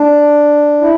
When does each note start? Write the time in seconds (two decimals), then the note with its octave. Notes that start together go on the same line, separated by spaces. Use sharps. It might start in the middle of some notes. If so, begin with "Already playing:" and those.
Already playing: D4
0.81 E4